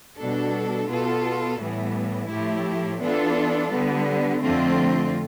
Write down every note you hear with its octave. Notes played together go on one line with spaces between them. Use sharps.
B2 G3 D4 A4
B2 B3 F4 A4
A2 E3 G3 B3
A2 F3 A3 E4 G4
E3 B3 D4 F4 A4
D3 G3 B3
F2 D3 A3 C4 F4